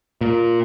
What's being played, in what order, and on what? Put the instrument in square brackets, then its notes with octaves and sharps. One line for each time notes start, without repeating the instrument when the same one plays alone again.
[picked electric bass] A#2